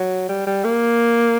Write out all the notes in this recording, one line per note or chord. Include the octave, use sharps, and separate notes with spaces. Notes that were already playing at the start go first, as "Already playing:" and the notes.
Already playing: F#3
G3
G3
A#3